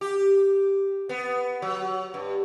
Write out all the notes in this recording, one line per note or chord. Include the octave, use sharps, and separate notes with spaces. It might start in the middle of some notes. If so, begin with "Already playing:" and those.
G4
B3
F#3
G2